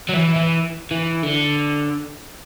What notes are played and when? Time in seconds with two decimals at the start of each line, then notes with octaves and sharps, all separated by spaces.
0.09 F#3
0.14 E3
0.36 E3
0.91 E3
1.23 D3